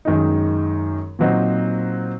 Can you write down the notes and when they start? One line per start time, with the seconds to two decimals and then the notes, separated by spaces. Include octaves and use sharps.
0.05 F#2 D#3 G#3 D#4
1.19 A#2 F#3 C4 D#4